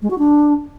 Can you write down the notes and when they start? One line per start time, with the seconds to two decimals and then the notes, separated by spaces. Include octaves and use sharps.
0.02 G#3
0.10 F#4
0.18 D4